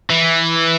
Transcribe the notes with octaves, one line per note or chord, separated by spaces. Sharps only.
E3